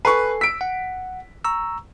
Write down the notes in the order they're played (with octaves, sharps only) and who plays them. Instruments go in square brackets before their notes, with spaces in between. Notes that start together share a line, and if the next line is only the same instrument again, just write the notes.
[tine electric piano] A4 G#5 C7 [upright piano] B4 C#6
[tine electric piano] E6 [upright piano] B6 D7
[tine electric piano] F#5
A#5 C#6 E6